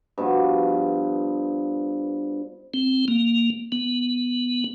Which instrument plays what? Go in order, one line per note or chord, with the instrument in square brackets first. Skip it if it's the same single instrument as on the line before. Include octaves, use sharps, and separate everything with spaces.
[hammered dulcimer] G2 B2 F3
[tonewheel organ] C4
A#3
B3